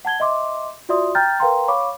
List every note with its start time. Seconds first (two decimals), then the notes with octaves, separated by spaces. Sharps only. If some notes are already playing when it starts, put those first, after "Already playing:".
0.05 F#5 A5 G#6 G7
0.20 D#5 E5 C6 D6
0.89 F4 F#4 D5 E5 C6 D#6
1.15 G5 A#5 F6 G6 A6
1.40 A#4 B4 F5 G5 A#5 C6
1.68 C#5 F5 B5 C#6 D6